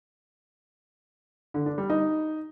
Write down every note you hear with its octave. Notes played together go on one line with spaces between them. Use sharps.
D3
D4
G3
D#4